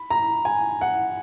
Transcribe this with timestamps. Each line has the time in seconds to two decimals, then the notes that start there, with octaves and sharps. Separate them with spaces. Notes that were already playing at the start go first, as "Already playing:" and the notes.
Already playing: B5
0.10 A#5
0.45 G#5
0.81 F#5